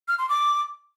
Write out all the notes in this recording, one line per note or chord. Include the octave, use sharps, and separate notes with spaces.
F6
C6
D6